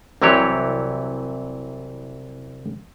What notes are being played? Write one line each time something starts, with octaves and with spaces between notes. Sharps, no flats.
C2 C3 E3 F#3 G4 C#5